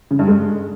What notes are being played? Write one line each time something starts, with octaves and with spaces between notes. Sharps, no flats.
C#3
G2
G#3